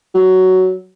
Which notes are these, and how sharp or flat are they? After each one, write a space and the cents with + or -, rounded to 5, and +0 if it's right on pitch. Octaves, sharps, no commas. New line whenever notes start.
F#3 +10